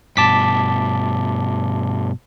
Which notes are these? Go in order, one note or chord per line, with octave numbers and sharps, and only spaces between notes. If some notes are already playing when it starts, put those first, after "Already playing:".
G2 B2 A5 D6 B6